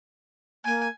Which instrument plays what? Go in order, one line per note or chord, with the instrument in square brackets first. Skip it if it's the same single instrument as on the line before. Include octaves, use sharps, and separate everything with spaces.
[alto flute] A#3 [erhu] G#5